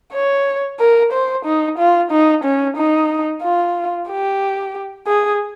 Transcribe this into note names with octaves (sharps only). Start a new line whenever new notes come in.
C#5
A#4
C5
D#4
F4
D#4
C#4
D#4
F4
G4
G#4